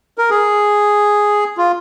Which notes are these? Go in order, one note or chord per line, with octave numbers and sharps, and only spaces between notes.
A#4
G#4
F4